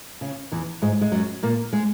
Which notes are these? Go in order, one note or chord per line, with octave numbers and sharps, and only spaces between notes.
C#3
E2 E3
G#2 G#3
G#3
F#2 F#3
A#2 A#3
G#3